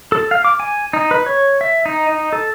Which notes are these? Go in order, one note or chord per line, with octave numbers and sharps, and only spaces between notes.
A4
F5
D6
G#5
D#4
B4
C#5
E5
D#4
D#4
A4